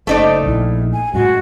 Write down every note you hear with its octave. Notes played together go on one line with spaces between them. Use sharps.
F#1 A3 D#4 C5 D5
A#1 E4
G#5
F#2 A2 G#3 F#4